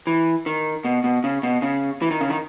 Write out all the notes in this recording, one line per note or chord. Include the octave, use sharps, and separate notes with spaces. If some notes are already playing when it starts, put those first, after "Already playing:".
E3
D#3
B2
B2
C#3
B2
C#3
E3
D#3
C#3
D#3